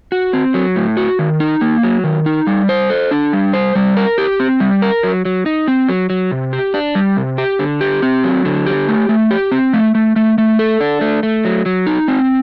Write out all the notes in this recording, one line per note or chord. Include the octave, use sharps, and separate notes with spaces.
F#4
C4
F#3
A2
F#4
D#3
D#4
A#3
F#3
D#3
D#4
G3
C5
A4
D4
G3
C5
G3
A#4
G4
C4
G3
A#4
F#3
F#3
D#4
C4
F#3
F#3
C3
G4
D4
G3
C3
G4
D3
G4
C4
F#3
D3
G4
A3
A3
G4
C4
A3
A3
A3
A3
A4
D4
A3
A3
F#3
F#3
D#4
C4